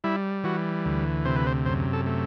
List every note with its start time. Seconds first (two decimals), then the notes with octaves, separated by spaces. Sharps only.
0.04 G3 E4
0.44 E3 F#4
0.85 D2
1.25 C3 C5
1.36 B4
1.47 C5
1.66 F#2 C5
1.93 A4
2.06 A3